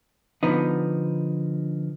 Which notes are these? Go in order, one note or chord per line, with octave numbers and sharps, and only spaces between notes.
D3 F3 B3 D#4